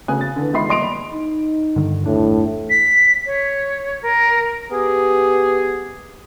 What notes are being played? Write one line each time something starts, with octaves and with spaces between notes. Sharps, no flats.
D2 C#3 G#5 D#6 F#6
A6
D3 E3
C#2 D#3 E5 B5 C6 C7
D#1 D#5 C6 D7 F7
B5
D#4
G2 D3 D#3
G1 E2 A2 D4
B6
C#5
A#4
B3 G4 G#4